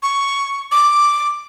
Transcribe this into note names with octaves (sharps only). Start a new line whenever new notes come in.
C#6
D6